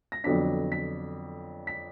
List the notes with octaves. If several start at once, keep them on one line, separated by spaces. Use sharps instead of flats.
A#6
F2 D3 F#3 B3 D4 B6
B6
B6